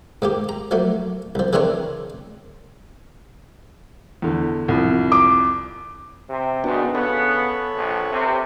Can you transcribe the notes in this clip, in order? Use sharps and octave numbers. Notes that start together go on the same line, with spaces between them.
G#2 A#3 G4
A#5
F3 F#3 A3 A#3
C2 F3
C#3 E3 C4 D4 A#4 C#5
E2 D3
C2 F2
D6
C3
G#2 B2 D#3 B3 D4 F#4
C#3 B3 A4 B4 C#5
A#1
C3